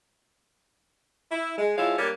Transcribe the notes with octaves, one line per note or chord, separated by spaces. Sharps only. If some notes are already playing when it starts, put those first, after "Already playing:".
E4
G#3
F3 G#3 E4 C#5 F5
G3 A#3 D4 C#5